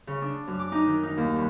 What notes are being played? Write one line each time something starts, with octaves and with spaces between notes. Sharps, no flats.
C#3
D4
F#2
D6
D#4
D#3
D#4
D#2
G2